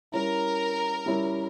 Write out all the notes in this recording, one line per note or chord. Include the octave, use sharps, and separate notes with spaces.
G3 C#4 E4 A#4
G3 C#4 E4